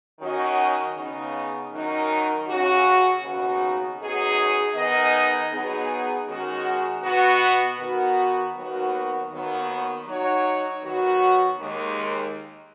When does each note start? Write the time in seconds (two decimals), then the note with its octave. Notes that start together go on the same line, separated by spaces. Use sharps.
0.19 D#3 F#3 C#4 F#4 D#5
0.95 C#3 B3 D#4
1.72 F#2 D#3 F#3 D#4
2.47 C#3 F#3 C#4 F#4
3.23 D#2 C#3 B3 D#4 F#4
3.99 F#2 F#3 B3 D#4 G#4
4.75 D#3 B3 D#4 G#4 D#5
5.51 F#3 B3 D#4 G#4
6.26 D#3 G#3 C#4 F#4
7.03 B2 B3 F#4
7.78 D#3 B3 F#4
8.54 D#2 D#3 F#3 B3 F#4
9.30 D#2 D#3 F#3 B3
10.06 F#3 D#4 F#4 C#5
10.82 D#3 F#3 B3 F#4
11.58 D#2 D#3 G#3